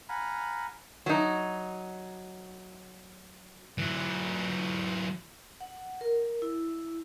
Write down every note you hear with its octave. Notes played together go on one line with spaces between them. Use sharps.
F5 F#5 G#5 A#5 B5
F#3 D#4
E3 F#3
F#5
A#4
E4